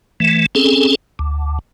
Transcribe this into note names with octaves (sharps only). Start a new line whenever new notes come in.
E3 A3
C4 C#4 G#4 A4
D2